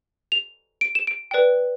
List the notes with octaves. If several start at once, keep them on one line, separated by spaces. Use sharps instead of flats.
F7
D7
E7
D7
B4 D5 G5